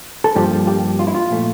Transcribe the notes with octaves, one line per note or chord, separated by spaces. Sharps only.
A4
G2 F3 A#3 G4
G4
F4
E4
F4
A#2 F3 A3